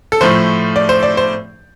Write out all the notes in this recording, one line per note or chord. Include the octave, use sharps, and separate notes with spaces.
A4
A2 F3 A3 C5
D5
C5
D5
C5